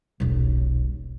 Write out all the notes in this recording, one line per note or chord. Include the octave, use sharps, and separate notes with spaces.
D#1 B1